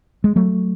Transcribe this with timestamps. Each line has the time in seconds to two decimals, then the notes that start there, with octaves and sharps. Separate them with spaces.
0.24 G#3
0.36 F#3 A3